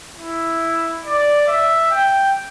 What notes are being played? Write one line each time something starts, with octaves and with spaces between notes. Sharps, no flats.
E4
D5
E5
G5